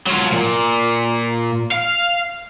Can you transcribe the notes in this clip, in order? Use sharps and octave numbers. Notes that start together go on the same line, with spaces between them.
F#3 F4
A#2
F5